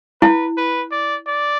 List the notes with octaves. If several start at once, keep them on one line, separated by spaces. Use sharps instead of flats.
E4 B4
B4
D5
D5